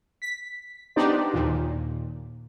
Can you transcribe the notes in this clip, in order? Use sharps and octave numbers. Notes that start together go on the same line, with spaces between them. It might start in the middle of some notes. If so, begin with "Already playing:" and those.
B6
B3 D4 D#4 G4 C5 D5
D#2 A#2